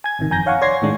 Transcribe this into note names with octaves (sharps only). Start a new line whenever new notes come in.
G#5 G#6
A1 C3 D#3
G1 F2 G#5 A#5 G6 A#6
C#5 F5 F#5 G#5 C#6
C#5 D5 C6 G#6 A#6 C7
A2 D#3 G#3 D4